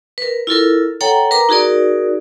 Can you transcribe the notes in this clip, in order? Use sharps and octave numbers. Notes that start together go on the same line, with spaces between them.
A#4 B4
E4 F4 A4 A#4
A4 C#5 F#5 G5 A#5
A#4 B4 A#5 D6
D#4 F#4 G#4 A#4 D5